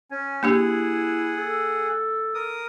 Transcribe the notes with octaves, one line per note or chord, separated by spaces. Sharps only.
C#4 G#5
A#3 D4 E4 G4 G#4 F#5
A4
A#4 D#6